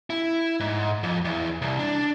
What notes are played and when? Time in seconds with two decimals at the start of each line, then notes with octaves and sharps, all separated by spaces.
0.10 E4
0.60 G#2
1.03 F2
1.25 E2
1.62 C2
1.79 D4